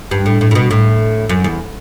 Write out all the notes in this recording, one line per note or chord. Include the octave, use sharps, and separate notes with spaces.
G2
A2
A2
A2
B2
A2
F#2
E2